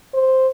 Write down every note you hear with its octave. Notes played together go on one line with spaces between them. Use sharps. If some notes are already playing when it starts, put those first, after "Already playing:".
C5